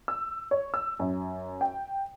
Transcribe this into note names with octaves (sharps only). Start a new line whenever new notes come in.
E6
C#5
E6
F#2
G5